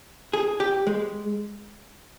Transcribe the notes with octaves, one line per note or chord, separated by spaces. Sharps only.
G#4
G4
G#3